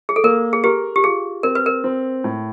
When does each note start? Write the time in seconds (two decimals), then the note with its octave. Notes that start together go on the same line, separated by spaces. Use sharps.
0.09 G#4
0.16 A4
0.24 A#3 A#4
0.53 G#4
0.64 G4 A#4
0.96 G4
1.04 F4 G#4
1.43 C4 A#4
1.55 B4
1.66 A#4
1.84 C4
2.24 A2